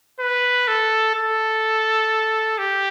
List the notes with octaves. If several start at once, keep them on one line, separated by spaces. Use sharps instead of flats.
B4
A4
A4
G4